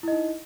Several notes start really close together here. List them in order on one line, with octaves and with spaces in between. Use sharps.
E4 D#5 D#4